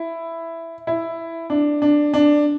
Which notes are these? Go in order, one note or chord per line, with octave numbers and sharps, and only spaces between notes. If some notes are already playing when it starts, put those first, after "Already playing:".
Already playing: E4
E4
D4
D4
D4